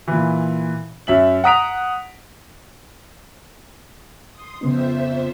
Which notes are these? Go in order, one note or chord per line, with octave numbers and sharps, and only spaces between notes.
A#2 E3
F#2 E5 F#7
F#5 A#5 D#6 B6 D7 F7
C6 D#6
F2 C#3 B3 D#4 C5 E5